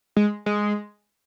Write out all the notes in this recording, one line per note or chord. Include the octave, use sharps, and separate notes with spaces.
G#3
G#3